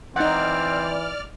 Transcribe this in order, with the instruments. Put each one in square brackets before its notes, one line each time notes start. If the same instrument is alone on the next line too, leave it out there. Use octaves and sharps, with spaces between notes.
[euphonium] E3 [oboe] C4 [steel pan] D#4 F#5 [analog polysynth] D5 F6